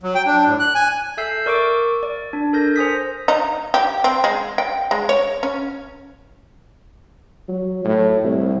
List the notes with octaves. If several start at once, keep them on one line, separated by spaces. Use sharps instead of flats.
F#3
G5
D4
A2
F#6
G#5
A4 E5 E6 G6 C7
A#4 D5 C#6 D6 E6 D7
D5
D4
A4 A#4 G6 A#6
C5 G#5 D#6 B6
D#4
G4
C4
G#3
G5
G#3
C#5
C#4
F#3
A2
C2